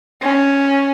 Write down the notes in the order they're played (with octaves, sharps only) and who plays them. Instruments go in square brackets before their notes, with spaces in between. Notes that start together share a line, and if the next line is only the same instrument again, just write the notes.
[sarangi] C#4